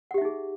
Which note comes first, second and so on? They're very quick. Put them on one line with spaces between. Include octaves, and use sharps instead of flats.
F#5 G4 E5 D#4 G#4